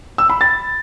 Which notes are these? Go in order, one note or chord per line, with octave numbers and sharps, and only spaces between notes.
E6
B5
A6